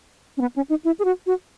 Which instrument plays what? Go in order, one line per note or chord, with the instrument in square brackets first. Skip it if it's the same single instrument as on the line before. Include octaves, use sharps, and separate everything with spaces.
[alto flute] C#4
B3
C#4
D#4
E4
G#4
F#4
F#4